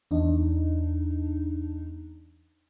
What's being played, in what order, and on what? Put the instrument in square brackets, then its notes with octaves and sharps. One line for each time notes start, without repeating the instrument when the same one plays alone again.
[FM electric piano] E2 D4 D#4